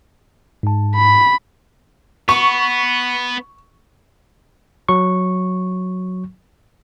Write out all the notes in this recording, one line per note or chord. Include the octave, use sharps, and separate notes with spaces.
G#2 A5
B5
B3 C#6
F#3 C#6